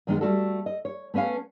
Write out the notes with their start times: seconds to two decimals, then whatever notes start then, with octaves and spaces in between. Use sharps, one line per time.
0.07 F#2 D#3 G#3 B3 D#4
0.21 G3 A3 F#4 A4
0.66 D#5
0.85 C#5
1.14 A3 B3 C#4 B4 F5